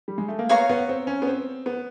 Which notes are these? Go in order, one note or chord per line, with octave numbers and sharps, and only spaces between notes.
G3
G#3
A3
A#3
B3 C#5 F5 A#5 C#6
B3
C4
C#4
B3
C4
B3